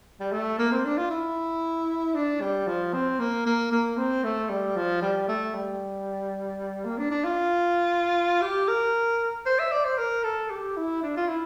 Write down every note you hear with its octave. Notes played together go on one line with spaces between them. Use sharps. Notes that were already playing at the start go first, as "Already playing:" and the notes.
G3
A3
A#3
C4
D4
F4
E4
D4
G3
F3
C4
A#3
A#3
A#3
C4
A3
G3
F3
G3
A3
G3
A#3
D4
D4
F4
G4
A#4
C5
E5
D5
C5
A#4
A4
G4
E4
D4
F4
E4